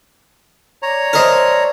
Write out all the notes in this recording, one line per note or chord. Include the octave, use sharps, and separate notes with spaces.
C#5 D5 A#5
A#4 C5 D#5 E5 A5